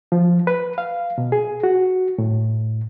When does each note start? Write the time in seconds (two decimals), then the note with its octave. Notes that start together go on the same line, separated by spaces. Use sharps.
0.12 F3
0.47 B4
0.78 F5
1.18 B2
1.32 G#4
1.63 F#4
2.18 A2